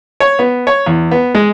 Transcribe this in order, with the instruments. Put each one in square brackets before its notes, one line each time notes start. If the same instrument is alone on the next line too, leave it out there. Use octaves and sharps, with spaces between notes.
[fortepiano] C#5
B3
C#5
E2
B3
G#3